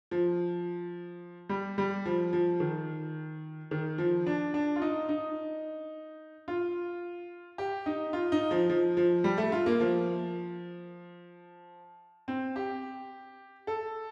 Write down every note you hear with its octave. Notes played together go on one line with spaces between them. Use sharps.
F3
G3
G3
F3
F3
D#3
D#3
F3
D4
D4
F4
D#4
D#4
F4
G4
D#4
F4
D#4
F3
F3
F3
G3
A3
F4
A#3
F3
C4
G4
A4